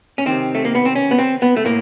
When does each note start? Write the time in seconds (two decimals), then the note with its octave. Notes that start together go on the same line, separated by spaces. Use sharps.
0.18 C#4
0.26 C3 D#3 C4
0.55 A3
0.65 A#3
0.75 B3
0.85 C4
0.95 C#4
1.11 B3
1.19 C4
1.42 B3
1.56 A3
1.65 A2 A#3